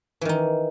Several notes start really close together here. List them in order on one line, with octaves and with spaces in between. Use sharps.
E3 D#3 D#4